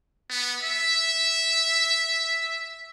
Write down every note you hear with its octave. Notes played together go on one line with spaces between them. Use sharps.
B3
E5